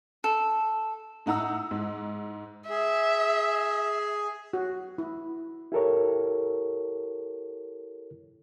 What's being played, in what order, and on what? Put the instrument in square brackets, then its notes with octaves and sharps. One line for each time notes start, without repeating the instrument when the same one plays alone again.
[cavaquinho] A4
[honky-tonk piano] A2 D#4 F#5 A#5 E6
G#2
[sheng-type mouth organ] G#4 [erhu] E5
[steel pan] F#4
E4
[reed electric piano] E4 G4 A4 A#4 C#5